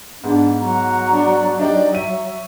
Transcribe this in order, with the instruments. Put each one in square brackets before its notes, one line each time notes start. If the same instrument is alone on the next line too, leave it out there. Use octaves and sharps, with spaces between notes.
[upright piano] G#2 B3 [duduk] D4
[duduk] F#3 [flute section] F#4 A#5
[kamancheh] D4 D5
[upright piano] D4 D#4 G4 [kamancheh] D5
[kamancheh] E5 [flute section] C#6 [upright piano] D#7